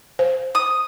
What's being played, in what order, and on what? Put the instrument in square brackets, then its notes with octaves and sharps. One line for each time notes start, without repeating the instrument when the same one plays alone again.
[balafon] C5
[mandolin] D#6